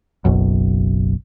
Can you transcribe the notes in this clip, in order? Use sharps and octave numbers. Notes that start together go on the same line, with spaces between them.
F#1 B1 F#2